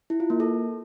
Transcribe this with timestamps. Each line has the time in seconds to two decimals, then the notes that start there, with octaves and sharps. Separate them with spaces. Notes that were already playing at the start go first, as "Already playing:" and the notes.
0.10 E4
0.20 F4
0.30 A#3
0.40 A4